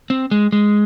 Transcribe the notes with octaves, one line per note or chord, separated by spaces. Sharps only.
C4
G#3
G#3